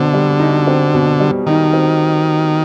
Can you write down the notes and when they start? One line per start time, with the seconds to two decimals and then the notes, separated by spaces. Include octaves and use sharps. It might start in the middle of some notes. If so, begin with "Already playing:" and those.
Already playing: B2 D3 C4
0.13 G3
0.40 D#4
0.67 C4
0.94 B2
1.20 G3
1.47 D#3 D#4
1.73 C4